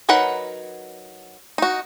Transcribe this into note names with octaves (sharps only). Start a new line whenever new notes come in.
F#3 D#4 A#4 B4 F#5
D#4 F#4